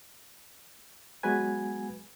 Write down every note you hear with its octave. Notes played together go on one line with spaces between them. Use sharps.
F#3 G#3 B3 F#4 B4 G#5